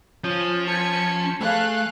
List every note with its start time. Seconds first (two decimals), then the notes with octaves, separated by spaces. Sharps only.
0.24 F3 C#4 F4
0.67 A5 G#6 B6 C#7
1.41 A3 G#4 F5 F#6